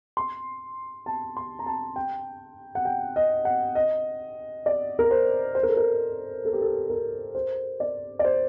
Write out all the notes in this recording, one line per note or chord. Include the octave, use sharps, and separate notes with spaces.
C6
A5
C6
A#5
A5
G5
F#5
G5
D#5
F#5
D#5
D5
A#4
C5
C5
A#4
A4
A#4
A4
G4
A4
A#4
C5
D5
D5
C5